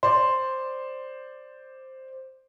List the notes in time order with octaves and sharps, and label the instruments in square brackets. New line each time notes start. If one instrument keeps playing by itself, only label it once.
[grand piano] C5 D5 [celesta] C6